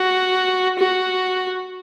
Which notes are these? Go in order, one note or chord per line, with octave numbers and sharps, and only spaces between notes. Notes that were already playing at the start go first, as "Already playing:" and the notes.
Already playing: F#4
F#4